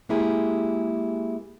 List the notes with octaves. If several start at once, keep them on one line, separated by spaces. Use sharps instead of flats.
G#3 A#3 E4 G4 G#4